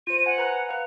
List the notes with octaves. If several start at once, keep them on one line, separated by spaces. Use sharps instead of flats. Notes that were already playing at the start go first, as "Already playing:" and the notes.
F4 C5 D#7
F#5 G#5
B4 A#5
B4 F5